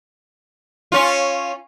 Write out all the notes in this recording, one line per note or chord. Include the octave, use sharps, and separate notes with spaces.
C#4 F4